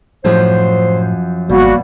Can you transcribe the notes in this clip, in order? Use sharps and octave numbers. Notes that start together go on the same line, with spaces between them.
F#2 A2 F3 C5
G#1 B2 G3 A#3 F#4